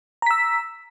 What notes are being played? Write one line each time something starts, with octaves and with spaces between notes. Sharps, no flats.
A#5 E6 B6